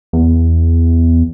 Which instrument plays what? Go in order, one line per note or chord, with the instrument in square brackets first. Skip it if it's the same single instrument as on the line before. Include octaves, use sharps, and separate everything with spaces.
[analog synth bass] E2